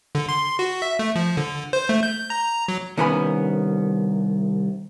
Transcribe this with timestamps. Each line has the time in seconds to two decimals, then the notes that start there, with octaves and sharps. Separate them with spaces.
0.15 D3
0.29 C6
0.59 F#4
0.82 E5
0.99 A3
1.16 F3
1.37 D3
1.73 C5
1.89 A3
2.03 G6
2.30 A#5
2.68 F#3
2.97 C2 D#3 B3 C#4 G#5 B5